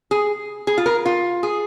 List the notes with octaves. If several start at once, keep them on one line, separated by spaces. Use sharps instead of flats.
G#4
G#4
F4
A#4
F4
G#4